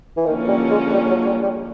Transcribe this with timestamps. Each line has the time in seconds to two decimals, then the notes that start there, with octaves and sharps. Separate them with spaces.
0.17 E3
0.26 D3 D#3 F3 A#3 C#4
0.48 G3
0.71 G#3
0.93 G3
1.10 F#3
1.26 G3
1.43 G3